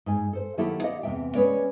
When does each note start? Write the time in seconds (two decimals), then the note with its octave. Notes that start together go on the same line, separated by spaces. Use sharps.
0.06 G#2 G#5
0.33 A4 C5
0.57 D#3 F#3 A#3 E4 G4 A4
0.83 G4 D5 D#5 F5 F#5
1.03 E2 C3 F#3 A3 E5 G5
1.35 G#3 C#4 B4 C#5 D5